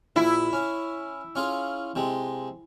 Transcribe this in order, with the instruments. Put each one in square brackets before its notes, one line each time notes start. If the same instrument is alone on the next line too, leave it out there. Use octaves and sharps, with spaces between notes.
[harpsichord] A#1 [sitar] E4
[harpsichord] C#4
C#4 F4 G#4
C3 G#3